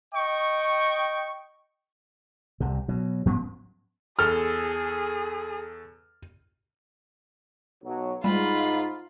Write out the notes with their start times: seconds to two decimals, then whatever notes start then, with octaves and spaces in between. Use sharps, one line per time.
0.15 D#5 G5 C#6
2.60 C2 C3
2.88 B2 F#3
3.26 G#2 F3 B3 C#4
4.19 E2 G#4 A4 F6
7.82 B1 F#3
8.24 G#2 G3 G#3 F4 B5